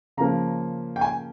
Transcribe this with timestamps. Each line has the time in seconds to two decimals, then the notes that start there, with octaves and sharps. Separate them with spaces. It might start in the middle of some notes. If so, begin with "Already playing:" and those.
0.17 C#3 F3 A#3 A#5
0.96 G5
1.01 G#5